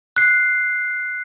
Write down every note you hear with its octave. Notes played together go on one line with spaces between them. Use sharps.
F#6 C7